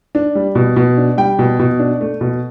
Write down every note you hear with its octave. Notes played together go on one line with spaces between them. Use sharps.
D4
G3
B2
B2
D4
G3 G5
B2
B2
D4
A3
B2